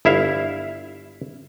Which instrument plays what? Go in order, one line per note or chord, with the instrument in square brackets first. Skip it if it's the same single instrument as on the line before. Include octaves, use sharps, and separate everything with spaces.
[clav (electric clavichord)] G1 E4 E5 F5